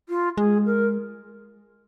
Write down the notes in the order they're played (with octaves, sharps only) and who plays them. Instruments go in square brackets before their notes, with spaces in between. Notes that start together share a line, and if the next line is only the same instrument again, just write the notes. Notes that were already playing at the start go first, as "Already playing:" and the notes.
[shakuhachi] F4
[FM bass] G#3 [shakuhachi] G#4
[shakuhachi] A#4